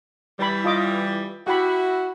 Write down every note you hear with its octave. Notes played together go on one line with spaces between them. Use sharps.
E3 G3 D5 B5
F4 D#5 D6
E4 F#4 G4 F#5 B5